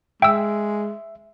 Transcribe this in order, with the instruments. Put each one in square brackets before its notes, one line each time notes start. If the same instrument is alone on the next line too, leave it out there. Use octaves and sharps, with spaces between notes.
[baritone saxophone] G#3 [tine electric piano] E5 [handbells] G5 E6